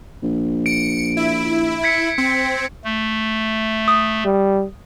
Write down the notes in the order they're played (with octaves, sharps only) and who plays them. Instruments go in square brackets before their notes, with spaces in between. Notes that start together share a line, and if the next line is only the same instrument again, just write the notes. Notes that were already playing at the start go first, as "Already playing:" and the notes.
[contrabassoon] A#1
[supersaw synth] C#7 [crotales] D7
[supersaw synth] E4
[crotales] G#6 B6 C#7
[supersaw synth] C4
[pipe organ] A3
[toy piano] D#6
[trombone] G3